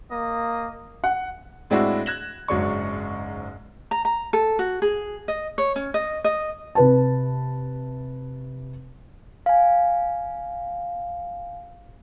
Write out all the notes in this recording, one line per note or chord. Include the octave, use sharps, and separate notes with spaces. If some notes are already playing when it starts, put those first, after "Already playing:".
A#3 D#5
F#5
A2 G#3 C4 D4 E4 F#4
F#6 G#6 A#6 E7 F#7
F#1 G#2 F#3 G#3 D4 C#6
A#5
A#5
A4
F#4
G#4
D#5
C#5
C#4
D#5
D#5
C3 B4 A5
F5 G#5